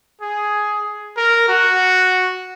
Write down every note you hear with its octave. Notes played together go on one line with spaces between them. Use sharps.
G#4
A#4
F#4